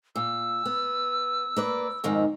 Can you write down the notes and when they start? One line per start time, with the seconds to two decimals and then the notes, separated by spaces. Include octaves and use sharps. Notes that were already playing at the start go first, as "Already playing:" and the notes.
0.16 A#2 E6
0.66 B3
1.57 A#3 B4 D5
2.04 F2 G#2 D#3